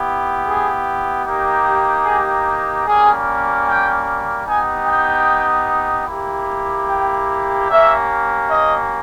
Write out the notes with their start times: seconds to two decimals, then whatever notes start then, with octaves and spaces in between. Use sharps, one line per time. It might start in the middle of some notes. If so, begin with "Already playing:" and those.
Already playing: B3 E4 G4
0.45 G#4
1.24 A#3 D#4 G4
2.05 G#4
2.85 G3 A#3 C#4 G#4
3.67 G5
4.46 B3 D#4 G4 G#5
4.87 G5
6.07 A#3 E4 G4
6.88 G5
7.69 A#3 C#4 G4 E5
8.49 D#5